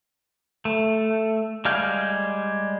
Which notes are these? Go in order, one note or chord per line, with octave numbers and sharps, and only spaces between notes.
A3
G3 G#3 F5 F6 G6